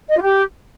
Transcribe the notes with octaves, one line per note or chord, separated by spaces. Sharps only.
D#5
F4
G4